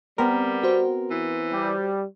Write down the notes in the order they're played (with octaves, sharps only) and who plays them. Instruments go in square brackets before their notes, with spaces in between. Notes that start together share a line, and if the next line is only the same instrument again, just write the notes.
[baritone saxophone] G3 [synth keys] B3 C4 A#4
[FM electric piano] F#4 C5
[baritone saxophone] E3
[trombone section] G3